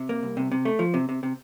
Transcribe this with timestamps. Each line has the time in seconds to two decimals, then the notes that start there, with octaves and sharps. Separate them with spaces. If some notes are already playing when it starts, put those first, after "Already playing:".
Already playing: C3
0.09 A#3
0.23 C2
0.37 C3
0.51 C3
0.65 A3
0.79 F3
0.94 C3
1.09 C3
1.23 C3